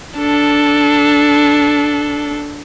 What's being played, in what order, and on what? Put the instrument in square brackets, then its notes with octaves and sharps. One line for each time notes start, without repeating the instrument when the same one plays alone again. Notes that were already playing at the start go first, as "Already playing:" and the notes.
[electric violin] D4 A4